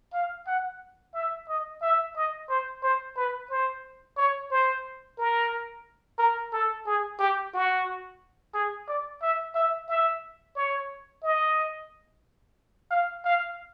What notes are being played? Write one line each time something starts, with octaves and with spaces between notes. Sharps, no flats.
F5
F#5
E5
D#5
E5
D#5
C5
C5
B4
C5
C#5
C5
A#4
A#4
A4
G#4
G4
F#4
G#4
D5
E5
E5
E5
C#5
D#5
F5
F5